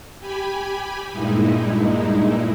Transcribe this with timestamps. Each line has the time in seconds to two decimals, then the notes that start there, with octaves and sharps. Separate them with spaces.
0.19 G4 G#5 B5
1.12 G2 A#2 G#3 D#4 E4